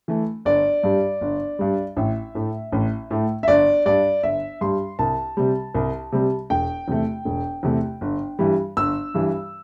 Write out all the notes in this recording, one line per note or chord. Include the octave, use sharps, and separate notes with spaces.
E3 A3
G1 D5
G2 G3
G1
G2 G3
A1 E5
A2 A3
A1
A2 A3
E5
G1 D5
G2 G3 D5
G1 E5
G2 G3 C6
C2 A5
C3 G3
C2
C3 G3
E1 G5
E2 C3 A3
E1
E2 C3 A3
G1
G2 E3 G3
G1 E6
G2 E3 G3